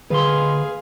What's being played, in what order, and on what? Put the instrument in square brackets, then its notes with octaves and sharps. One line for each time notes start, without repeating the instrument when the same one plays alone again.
[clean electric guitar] C#2 A#2 C6 [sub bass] D3 [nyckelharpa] G#4 F5 [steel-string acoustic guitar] B4